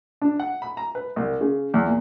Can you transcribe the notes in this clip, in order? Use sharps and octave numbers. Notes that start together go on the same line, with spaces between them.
D4
F#5
B5
A#5
B4
C2
C#3
E2
A#2